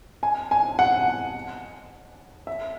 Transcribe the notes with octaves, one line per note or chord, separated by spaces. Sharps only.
G#5
G#5
F#5
E5